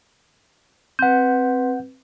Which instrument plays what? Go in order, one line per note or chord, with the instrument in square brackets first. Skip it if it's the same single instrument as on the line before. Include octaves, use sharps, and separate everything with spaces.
[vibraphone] C4 B4 [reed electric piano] F#5 G6